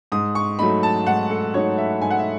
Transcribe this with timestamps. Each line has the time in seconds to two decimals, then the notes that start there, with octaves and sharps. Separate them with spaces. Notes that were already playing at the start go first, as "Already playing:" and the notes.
0.12 G#2 D#6
0.35 C#6
0.59 F#3 A3 D#4 B5
0.83 A5
1.06 G#2 F#5
1.30 A4
1.54 F#3 A3 D#4 C#5
1.78 E5
2.01 G#2 G#5
2.10 F#5
2.19 E5